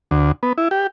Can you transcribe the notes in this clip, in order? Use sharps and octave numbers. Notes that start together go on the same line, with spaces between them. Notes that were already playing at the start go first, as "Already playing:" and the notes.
D2
B3
E4
G4